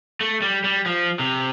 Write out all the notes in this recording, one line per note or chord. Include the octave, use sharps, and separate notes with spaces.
A3
G3
G3
F3
C3